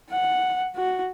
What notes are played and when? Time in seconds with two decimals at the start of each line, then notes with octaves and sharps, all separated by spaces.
0.11 F#5
0.76 F#4